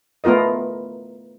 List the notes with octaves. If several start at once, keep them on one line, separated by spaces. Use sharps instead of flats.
A3 B3 F4 A#4 D#5